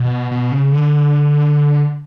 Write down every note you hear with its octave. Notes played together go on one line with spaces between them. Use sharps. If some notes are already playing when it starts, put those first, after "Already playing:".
Already playing: B2
B2
C#3
D3